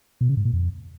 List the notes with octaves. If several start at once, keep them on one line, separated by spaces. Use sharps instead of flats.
B2
C#3
G#2
A#2
F2